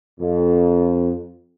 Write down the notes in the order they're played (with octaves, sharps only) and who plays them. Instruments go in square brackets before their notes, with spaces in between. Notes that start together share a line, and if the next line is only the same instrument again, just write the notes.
[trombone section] F2